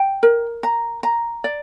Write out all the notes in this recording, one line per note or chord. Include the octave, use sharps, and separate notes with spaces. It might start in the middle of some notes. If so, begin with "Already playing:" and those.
Already playing: G5
A#4
A#5
A#5
D5